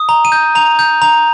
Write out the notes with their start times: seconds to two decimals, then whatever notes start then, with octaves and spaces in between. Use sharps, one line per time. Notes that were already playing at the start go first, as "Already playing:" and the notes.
Already playing: D#6
0.09 A#5
0.25 D#7
0.32 G6
0.55 A#5 F7
0.79 G6
1.02 A#5 F7